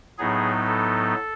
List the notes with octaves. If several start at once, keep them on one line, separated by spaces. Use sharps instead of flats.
A2 F#3 B3 D#4 G#4
A4